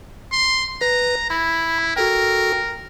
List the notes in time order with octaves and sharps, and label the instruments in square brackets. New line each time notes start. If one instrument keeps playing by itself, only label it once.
[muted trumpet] C6
[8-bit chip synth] B4 [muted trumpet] A#5
[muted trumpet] E4 [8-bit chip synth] B5
[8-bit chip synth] F#4 A4 G5 [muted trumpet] A#4